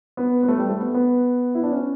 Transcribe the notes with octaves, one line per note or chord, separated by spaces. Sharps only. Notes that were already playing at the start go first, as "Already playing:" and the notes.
B3
B3
A3
G3
A3
B3
B3
E4
D4
C#4